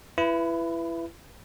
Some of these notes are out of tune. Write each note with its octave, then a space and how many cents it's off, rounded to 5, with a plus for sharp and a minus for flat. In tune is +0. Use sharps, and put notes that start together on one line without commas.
E4 +25 B4 +0